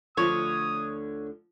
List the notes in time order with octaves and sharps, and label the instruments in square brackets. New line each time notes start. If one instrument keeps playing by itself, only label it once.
[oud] D2 D3 [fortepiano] F3 [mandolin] C#5 [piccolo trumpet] D#6